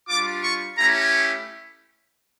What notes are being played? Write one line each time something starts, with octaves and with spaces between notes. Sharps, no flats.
G3 D4 F4 D6
C#6
A3 C#4 E4 G4 A#5